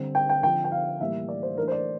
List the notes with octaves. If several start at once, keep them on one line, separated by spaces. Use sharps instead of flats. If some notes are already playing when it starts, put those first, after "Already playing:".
Already playing: D3 G3 C4
G5
G5
D3 F3 C4 G5
G5
F5
A2 E3 G3 A#3 E5
D5
C5
E3 A3 D4 A#4
C5
D5